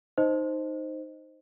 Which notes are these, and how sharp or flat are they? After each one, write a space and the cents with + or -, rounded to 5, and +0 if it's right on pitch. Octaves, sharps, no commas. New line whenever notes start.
D#4 +0 C5 +0 D#5 +0